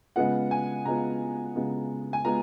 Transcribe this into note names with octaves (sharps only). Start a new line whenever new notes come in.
C#3 G#3 B3 F4 F#5
G#5
C#3 G#3 B3 F4 A#5
C#3 G#3 B3 F4
G#5
G#3 B3 F4 A#5